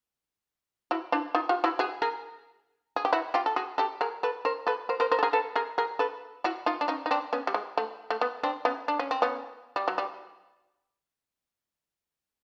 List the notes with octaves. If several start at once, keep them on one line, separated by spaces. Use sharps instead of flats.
E4 F#4
D4 E4
D#4 F4
F4 G4
E4 F#4
F#4 G#4
G#4 A#4
G#4
G4
E4 F#4
F4 G4
A4
F#4 G#4
G4 A4
G#4 A#4
A4 B4
A#4 C5
A4 B4
A#4 C5
A#4 C5
A#4 C5
A4
G#4 A#4
A4 B4
G#4 A#4
G#4 A#4
A4 B4
E4 F#4
D#4 F4
D4
C#4 D#4
D#4
C4 D4
B3 C#4
G3
G#3
A3
A3
B3
C4 D4
B3 C#4
D4
C#4
C4
B3 C#4
G3
F#3
G3